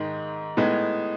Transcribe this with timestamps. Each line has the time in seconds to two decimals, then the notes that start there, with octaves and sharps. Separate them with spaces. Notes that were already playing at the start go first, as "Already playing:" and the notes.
Already playing: G#2 D#3 G#3 D#4
0.57 A2 G#3 B3 D#4